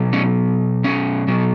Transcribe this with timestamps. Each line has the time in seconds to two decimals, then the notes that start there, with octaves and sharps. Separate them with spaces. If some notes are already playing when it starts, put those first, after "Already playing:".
Already playing: B2 F#3
0.13 C#4
0.84 C#4
1.28 B2 F#3